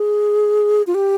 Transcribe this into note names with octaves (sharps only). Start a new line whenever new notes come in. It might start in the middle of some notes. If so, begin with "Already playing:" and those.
Already playing: G#4
F4
G4